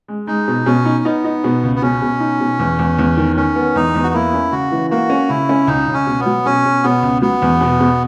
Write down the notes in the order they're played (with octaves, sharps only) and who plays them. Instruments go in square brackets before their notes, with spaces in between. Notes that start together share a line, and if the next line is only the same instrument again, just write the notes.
[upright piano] G#3
[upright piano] G#3 [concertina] D#4
[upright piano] B2
[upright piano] B2 [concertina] C#4
[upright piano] D#4
[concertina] B3 [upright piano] D#4
[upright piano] D#4
B2
C#2
[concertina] B3
[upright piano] B2 [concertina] C#4
[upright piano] B2
D#4
B2
E2
E2
E2
D#3
[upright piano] D#3 [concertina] C#4
[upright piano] B3
[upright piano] E2 [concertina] D#4
[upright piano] E2
[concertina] F#4
[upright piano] A#3 [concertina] E4
[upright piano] C#4
[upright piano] C#3 [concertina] F#4
[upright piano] E3
[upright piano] A#3 [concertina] F#4
[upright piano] C#4
[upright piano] C#3 [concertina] E4
[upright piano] C#4
[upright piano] C#2 [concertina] D#4
[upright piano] C#2
[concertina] C#4
[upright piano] B2
[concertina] B3
[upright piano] F#3
[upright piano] B2 [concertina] C#4
[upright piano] B2
[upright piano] B2 [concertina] B3
[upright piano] C#2
[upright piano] F#3 [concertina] B3
[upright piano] E2
B2
B2